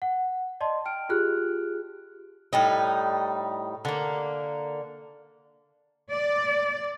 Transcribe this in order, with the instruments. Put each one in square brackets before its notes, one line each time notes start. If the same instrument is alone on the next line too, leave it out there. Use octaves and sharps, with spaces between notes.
[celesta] F#5
D5 D#5 A5 C6
G5 F6 D7
F4 G4 G#4 F6 F#6
[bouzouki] A2 G3 D#4
D3 A#3
[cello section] D5